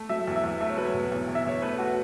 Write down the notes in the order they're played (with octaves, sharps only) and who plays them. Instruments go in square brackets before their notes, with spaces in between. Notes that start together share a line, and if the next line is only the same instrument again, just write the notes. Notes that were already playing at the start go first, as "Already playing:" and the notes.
Already playing: [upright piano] A3
F#3 E5
E2
E5
E2
A3 E5
C#5
F#3 B4
C#5
B2
E2
E2
E5
E2 C#5
A3 B4
A3 F#4